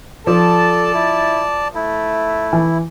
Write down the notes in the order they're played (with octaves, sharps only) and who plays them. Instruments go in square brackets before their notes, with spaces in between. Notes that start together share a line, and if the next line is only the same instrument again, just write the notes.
[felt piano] F3 [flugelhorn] A4 [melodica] D5 A5
[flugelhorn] E4
[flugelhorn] A3 [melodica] E4
[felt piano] E3